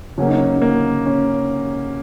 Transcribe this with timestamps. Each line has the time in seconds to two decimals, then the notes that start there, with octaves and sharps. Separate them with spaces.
0.18 C#3 F#3 A#3 C#4
0.28 D#4
0.37 C#4
0.62 A#3
1.06 C#4